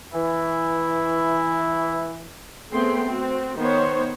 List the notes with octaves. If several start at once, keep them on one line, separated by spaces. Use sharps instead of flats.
E3 E4
A3 B3 C4 G#4 G5 C6
C4 F#4
D#3 B3 C5 C#5